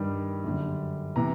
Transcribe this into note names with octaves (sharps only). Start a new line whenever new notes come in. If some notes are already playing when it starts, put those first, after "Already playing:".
Already playing: G2 D#3 G3
F#2 D3 G3
C3 E3 A#5